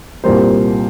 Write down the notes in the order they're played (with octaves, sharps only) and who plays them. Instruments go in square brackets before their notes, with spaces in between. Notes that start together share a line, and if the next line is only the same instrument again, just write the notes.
[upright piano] C2 A#2 G3 A#3 C5